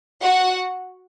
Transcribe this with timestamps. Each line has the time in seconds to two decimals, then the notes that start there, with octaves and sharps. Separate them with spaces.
0.21 F#4 F#5